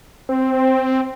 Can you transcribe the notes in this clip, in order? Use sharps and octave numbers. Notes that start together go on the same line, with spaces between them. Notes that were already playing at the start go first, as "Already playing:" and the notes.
C4